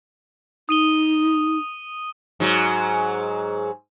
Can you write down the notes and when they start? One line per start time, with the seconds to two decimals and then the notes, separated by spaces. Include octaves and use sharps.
0.69 D#4 D#6 D#7 G7
2.40 G#2 F#3